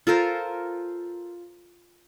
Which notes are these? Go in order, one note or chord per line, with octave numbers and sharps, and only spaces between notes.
F4 A4 A#4 C5